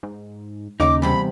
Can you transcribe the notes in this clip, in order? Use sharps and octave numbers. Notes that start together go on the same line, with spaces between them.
G#2
D#2 C#3 D#4 D6
E2 G2 C3 B5